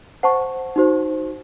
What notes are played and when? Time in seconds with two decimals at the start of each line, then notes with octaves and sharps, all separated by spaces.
0.23 C5 F#5 A5 C#6
0.76 D#4 F#4 C5